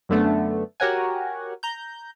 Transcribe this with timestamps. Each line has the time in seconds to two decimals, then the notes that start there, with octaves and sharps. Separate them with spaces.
0.09 F#2 D3 A3 B3
0.80 F#4 G4 A#4 C#5 F#5 G#5
1.63 A#5 G6